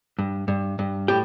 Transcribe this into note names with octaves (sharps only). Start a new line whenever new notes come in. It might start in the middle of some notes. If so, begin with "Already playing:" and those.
G2
G2
G2
A2 G4